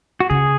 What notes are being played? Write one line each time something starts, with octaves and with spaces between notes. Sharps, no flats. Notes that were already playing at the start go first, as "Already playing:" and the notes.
F#4
C#3 G#4